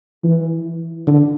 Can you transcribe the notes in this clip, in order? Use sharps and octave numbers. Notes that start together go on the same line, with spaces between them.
E3
D3